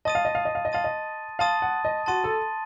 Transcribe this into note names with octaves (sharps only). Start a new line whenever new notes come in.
D#5 A5 C6 D#6 A6 D#7
F5
D#5
F5
D#5
F5
D#5
F5 A5 C6 D#6 A6 D#7
D#5
F5 A5 C6 D#6 A6 D#7
F#5
D#5
F#4 A5 C6 D#6 A6 D#7
A4